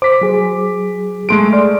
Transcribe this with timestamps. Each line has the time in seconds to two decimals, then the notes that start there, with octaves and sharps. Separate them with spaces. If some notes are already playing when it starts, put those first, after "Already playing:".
0.02 C5 D6 B6
0.22 F#3 G#4
1.29 G#3 A3 G#4 C6 D7
1.53 D5 C6 F6